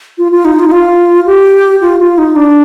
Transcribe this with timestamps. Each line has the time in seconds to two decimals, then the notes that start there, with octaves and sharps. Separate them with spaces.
0.18 F4
0.32 F4
0.45 D#4
0.59 F4
0.68 D#4
0.72 F4
1.26 G4
1.81 F4
2.00 F4
2.18 D#4
2.36 D4